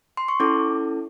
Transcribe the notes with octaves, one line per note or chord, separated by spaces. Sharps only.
C6
C#6
C#4 E4 A4 D6